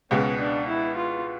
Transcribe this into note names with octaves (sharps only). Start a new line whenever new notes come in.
C#2 B2 G#3 C#4
D4
E4
F4